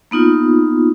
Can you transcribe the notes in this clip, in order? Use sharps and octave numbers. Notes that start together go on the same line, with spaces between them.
A#3 B3 D#4 F4